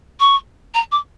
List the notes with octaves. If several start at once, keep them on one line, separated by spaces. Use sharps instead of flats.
C#6
A#5
D6